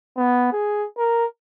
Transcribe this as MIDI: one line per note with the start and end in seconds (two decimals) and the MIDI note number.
0.17 0.50 59
0.53 0.86 68
0.98 1.25 70